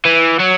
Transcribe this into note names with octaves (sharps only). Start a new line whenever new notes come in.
E3
F#3